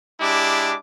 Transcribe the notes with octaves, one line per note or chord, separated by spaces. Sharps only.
G#3 D4 E4 G4 D6